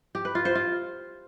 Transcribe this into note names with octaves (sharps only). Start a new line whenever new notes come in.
G4
B4
F4
C5
F4